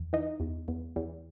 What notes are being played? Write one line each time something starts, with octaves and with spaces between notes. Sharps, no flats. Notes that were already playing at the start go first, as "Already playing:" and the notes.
Already playing: E2
E3 D#4
E2
E2
E2